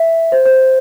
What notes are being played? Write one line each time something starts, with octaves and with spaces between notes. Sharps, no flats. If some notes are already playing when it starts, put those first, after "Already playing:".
Already playing: E5
C5
C5